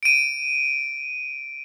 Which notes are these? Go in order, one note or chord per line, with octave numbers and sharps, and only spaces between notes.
D7 D#7